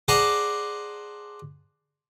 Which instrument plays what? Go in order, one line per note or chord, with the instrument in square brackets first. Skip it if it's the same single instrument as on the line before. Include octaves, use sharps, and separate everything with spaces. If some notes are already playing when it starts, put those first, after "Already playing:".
[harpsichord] G#4 C5 D5 F#5 A5 A#5